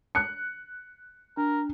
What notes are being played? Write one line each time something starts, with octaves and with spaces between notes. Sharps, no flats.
F#6 C#7
D4 A#4